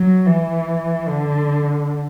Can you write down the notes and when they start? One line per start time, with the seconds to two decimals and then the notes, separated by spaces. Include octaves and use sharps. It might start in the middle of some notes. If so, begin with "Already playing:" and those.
Already playing: F#3
0.26 E3
1.08 D3